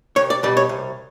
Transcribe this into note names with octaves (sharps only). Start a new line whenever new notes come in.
C2 C#5
D5
B2 G3 D5
C#5
C2